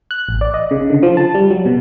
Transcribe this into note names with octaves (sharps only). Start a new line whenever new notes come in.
F#6
A1
D5
D#5
C#3
D3
F3
A5
G3
F#3
B2